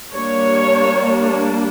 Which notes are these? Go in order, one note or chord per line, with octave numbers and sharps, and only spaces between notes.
G3 A#3 D4 C#5